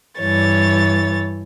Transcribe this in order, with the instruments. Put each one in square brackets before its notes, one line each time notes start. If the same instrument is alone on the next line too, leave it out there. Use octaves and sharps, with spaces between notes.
[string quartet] G2 E3 C#5 A6